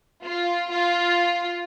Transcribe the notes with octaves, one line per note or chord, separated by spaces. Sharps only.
F4
F4